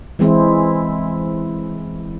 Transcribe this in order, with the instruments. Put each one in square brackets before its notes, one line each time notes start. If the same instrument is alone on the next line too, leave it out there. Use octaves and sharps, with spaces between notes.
[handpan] E3 G#3 C4 E4